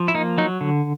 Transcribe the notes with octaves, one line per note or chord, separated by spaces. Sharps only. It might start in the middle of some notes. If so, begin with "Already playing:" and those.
Already playing: F3
E4
A#3 D#4
F#3 D#4
D3